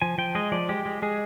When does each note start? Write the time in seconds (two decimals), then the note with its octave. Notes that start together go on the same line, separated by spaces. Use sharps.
0.02 F3 G#5
0.18 F3 G5
0.35 G#3 D#5
0.52 F3 D5
0.69 G#3 G4
0.86 G#3
1.02 G#3 G#4